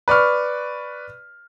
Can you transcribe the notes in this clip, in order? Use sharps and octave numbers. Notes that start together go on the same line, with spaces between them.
B4 D5 C#6 F6